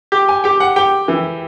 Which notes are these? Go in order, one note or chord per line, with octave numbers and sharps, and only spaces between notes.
G4
G#5
G4 G5
F#5
G4 G5
E3